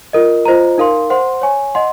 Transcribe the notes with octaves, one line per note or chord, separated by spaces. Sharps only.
F4 A#4 D#5
F4 C5 D#5 A#5
D#4 A#4 F5 C6
C5 F#5 C6
C#5 G#5 C#6
D#5 F#5 C6